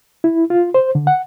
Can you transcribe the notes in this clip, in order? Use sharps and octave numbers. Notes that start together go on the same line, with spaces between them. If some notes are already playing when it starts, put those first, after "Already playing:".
E4
F4
C5
D3
F#5